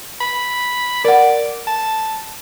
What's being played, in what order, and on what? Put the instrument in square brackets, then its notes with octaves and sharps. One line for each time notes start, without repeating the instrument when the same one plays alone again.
[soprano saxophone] B5
[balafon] A#4 F#5 [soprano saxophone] D5
[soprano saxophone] A5